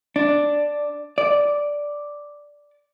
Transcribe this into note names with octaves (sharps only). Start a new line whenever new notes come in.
D4
D5